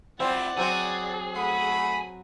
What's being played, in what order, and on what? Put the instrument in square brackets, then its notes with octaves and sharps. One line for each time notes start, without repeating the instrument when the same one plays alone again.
[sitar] C4 [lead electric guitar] E4 F4 [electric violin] D5 F#5
[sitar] F#3 C4 F#4 [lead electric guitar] G#4
[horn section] A3 B5 [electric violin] F#5